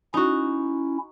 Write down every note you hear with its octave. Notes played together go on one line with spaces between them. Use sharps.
C#4 D#4 E4 F#4